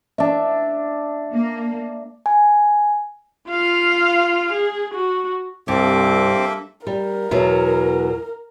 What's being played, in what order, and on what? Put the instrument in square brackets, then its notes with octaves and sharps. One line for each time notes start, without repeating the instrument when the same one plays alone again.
[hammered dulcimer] D4 E5
[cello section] A#3
[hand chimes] G#5
[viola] F4 F5
G#4
F#4
[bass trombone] C2 [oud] G2 [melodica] A#3 A4 E5 [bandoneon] C4 D6
[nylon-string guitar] G3 [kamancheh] A#4
[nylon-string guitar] E2 B2 F#3